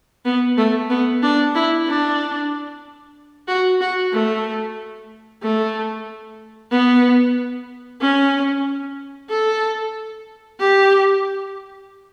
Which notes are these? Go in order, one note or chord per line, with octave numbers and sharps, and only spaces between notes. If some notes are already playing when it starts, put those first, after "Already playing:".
B3
A3
B3
D4
E4
D4
F#4
F#4
A3
A3
B3
C#4
A4
G4